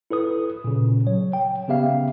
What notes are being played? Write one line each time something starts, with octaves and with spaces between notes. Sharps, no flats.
E4 A4 B4 D#6
A#2 C#3
F#3 C#5
G5
C#3 B3 G4 E5 F5